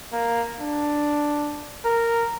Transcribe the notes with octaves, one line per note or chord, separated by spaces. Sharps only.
A#3
D4
A#4